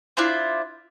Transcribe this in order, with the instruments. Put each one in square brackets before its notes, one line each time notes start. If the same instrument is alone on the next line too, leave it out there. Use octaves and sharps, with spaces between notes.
[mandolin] D4 E4 F4 C5